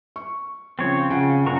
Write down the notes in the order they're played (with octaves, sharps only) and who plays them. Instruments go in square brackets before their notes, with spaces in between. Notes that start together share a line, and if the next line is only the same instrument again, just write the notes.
[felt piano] C#6
[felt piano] C#3 F3 [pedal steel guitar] C4 C#5
[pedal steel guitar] C#3 [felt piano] F4 F#5 G5
[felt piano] F#2 A#2 C#3 [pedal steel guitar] F#4 A#5 C#6